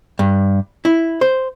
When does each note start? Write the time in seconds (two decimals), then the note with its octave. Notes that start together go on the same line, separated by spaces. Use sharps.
0.19 G2
0.85 E4
1.21 C5